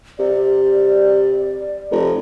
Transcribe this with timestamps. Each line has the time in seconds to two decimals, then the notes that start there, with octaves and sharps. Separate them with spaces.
0.19 C3 D5
1.91 F1